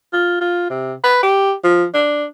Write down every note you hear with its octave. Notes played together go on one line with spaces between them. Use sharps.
F4
F4
C3
B4
G4
F3
D4